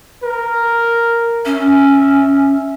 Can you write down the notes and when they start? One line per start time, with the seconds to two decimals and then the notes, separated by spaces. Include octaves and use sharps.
0.23 A#4
1.46 C#4 E5